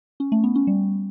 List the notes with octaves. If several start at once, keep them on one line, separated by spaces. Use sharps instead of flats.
C#4
A3
B3
C#4
G3